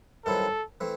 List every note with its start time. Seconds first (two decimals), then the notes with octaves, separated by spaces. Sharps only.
0.25 G2 D#3 F#3 C4 E4 A4
0.81 E3 A3 C4